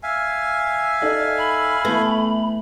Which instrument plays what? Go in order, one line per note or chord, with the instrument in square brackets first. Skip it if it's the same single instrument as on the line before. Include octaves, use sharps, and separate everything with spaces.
[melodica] E5 F5 G#5
[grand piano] D#4 A4 D#5 [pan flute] D5
[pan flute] B5
[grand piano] E3 B3 [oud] A3